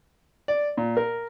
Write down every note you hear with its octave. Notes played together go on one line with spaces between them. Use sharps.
D5
A#2
A#4